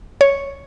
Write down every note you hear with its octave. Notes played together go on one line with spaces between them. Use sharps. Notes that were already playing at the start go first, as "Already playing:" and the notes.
C#5